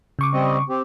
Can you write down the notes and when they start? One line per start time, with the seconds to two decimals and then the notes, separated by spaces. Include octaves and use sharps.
0.19 C#3 C#6 D6
0.33 G3 C4 D#5
0.69 C4 G4